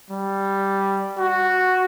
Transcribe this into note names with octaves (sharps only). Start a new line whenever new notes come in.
G3
F#4